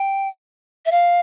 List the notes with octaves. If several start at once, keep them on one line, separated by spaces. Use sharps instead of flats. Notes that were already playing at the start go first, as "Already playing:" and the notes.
Already playing: G5
E5
F5